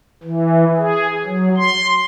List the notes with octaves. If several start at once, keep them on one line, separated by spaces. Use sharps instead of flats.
E3
G#4
F#3
C6